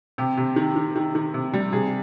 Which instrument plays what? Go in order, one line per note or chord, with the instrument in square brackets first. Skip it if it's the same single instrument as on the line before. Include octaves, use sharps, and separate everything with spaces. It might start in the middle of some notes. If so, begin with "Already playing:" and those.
[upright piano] C3 G4
C3
D#3
D#3
D#3
D#3
C3
G3
C3 G#4